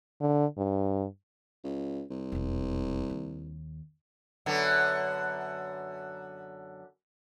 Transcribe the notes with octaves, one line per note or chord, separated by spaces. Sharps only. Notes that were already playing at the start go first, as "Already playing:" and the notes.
D3
G2
C#2
C2
E1 F2
D#2
F#2 D3 B3